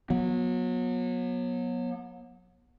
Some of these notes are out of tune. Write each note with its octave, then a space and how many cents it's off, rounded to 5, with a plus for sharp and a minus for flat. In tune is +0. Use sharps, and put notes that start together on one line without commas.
F#3 -30 B3 -30